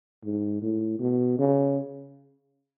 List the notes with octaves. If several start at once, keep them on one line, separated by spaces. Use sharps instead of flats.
G#2
A2
B2
C#3